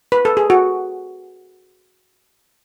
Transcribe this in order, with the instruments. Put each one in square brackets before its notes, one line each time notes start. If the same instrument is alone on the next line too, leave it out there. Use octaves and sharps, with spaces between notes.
[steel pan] B4
A4
G#4
F#4